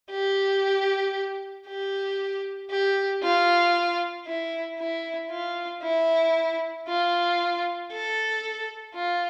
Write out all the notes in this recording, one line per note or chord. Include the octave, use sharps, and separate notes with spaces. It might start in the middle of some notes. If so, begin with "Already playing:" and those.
G4
G4
G4
F4
E4
E4
F4
E4
F4
A4
F4